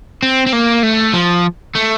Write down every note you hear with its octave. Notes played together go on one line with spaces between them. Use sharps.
C4
C4
A#3
A3
F3
A3